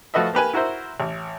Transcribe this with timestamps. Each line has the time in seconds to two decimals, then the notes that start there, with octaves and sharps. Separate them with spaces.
0.14 F3 A3 F#4 B4 D#5 E5
0.34 A#3 G4 B4 G#5
0.53 E4 F#4 A#4 C5 E5
1.00 A1